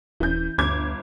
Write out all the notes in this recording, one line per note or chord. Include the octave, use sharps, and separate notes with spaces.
D#1 E3 G6
G1 D2 D6 G#6